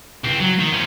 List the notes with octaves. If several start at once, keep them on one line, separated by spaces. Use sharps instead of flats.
C#2 C4
F#3
D#3
F3 C#4